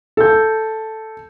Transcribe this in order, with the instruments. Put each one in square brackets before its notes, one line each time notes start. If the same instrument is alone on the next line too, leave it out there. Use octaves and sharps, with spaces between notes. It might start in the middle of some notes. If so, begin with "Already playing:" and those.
[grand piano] A4 G6